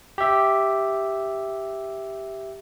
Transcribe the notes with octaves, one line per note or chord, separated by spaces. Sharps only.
G4 E5